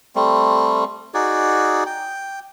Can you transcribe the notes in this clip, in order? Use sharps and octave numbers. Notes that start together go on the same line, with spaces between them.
G3 A3 C4
D#4 F#4 G#4 D5
G5